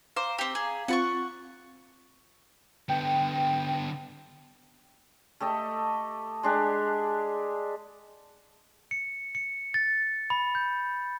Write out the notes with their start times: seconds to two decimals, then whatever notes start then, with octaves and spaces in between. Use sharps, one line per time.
0.16 C5 F5 A#5 D6
0.38 C4 G4
0.55 G#4
0.88 C4 F4 F#5 B5 C#6 A6
2.89 D3 B3 G5
5.40 A3 G4 A4 D#5
6.43 G#3 D4 G4
8.91 C#7
9.35 C#7
9.74 A6
10.30 B5
10.55 G6